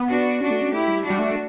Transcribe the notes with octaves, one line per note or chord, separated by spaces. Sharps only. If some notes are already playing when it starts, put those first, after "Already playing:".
Already playing: B3
D4 F#4
C#4 D4 F#4
A3
C#4
A3 E4 G4
G3
D4 F#4
G3
A3